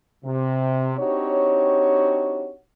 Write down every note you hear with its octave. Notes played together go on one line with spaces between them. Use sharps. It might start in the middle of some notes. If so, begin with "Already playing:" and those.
C3
C4 D4 D#4 F#4 G4 C#5